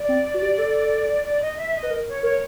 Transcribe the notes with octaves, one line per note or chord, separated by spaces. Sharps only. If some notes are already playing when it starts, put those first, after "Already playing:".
Already playing: D5
C4
F#4
G4
A4
D5
D#5
E5
D#5
B4
A#4
C#5
A#4 C#5